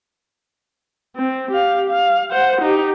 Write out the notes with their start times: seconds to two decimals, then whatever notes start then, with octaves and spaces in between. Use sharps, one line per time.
1.16 C4
1.51 G4 F5
1.90 F5
2.31 C5 F#5
2.61 D#4 G4